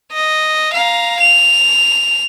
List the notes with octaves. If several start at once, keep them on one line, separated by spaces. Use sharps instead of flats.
D#5
F5 A#5
F7